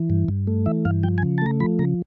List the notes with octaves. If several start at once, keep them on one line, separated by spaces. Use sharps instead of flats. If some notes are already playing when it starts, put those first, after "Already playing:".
Already playing: E3
G2
G2
A3
E3 E5
G2 F5
F3 G5
G#5
C#3
A5
A3 A#5
F3 B5
C#3 A#5